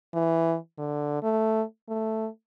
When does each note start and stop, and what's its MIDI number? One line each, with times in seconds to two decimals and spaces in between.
0.14 0.56 52
0.78 1.22 50
1.23 1.63 57
1.89 2.28 57